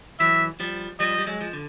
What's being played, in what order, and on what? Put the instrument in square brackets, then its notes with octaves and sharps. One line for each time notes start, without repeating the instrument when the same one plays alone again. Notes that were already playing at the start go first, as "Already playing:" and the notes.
[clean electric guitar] E3 F#3 [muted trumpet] E5
[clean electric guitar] F3 G3
[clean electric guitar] F3 G3 [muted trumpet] D#5
[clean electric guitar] G3
F#3 G#3
F3
D3